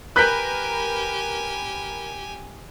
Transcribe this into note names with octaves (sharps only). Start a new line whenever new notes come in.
G4 A#4 B4 G#5 F#6 G6 B6